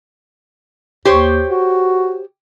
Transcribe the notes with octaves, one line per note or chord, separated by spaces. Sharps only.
D#2 G4 C5 C#5
F#4